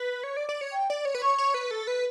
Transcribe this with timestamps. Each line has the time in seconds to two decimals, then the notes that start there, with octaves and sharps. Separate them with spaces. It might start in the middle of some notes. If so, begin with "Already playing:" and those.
Already playing: B4
0.24 C#5
0.37 D5
0.49 D5
0.61 C#5
0.72 G5
0.90 D5
1.05 C#5
1.15 B4
1.22 C#5 C#6
1.38 C#5
1.54 B4
1.71 A4
1.87 B4